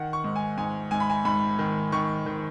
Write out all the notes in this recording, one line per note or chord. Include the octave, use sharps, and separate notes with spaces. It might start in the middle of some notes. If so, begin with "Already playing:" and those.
Already playing: D#3 F#5
C#6
G#2
G#5
G#2 G#5
G#2 G#5
B5
G#5
G#2 B5
D#3
D#3 C#6
D#3